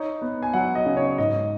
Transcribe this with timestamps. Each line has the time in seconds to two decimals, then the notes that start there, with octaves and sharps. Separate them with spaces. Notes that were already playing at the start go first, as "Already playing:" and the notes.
Already playing: D#4 C#5
0.22 B3
0.43 G#5
0.53 F#3 F#5
0.75 D#5
0.86 C#3
0.97 C#5
1.18 G#2 D#5